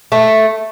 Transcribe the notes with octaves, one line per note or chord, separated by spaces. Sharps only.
A3